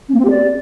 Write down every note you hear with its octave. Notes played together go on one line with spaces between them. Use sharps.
C#4
A#3
C4
G4
D5